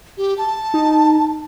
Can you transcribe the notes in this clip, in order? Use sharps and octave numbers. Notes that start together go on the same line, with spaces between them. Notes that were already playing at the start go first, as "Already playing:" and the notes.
G4
A5
D#4